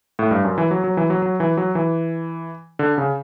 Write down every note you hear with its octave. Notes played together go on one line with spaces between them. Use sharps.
A2
G2
F#2
E3
F#3
F#3
E3
F#3
F#3
E3
F#3
E3
D3
C#3